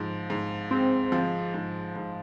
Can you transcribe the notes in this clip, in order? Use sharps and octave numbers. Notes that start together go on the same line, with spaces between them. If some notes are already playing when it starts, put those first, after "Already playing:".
Already playing: G#2 F3
G#2
G#3 C4
F3
G#2
G#2